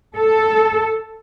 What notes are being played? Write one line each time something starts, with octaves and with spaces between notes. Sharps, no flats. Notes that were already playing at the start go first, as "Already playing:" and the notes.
A4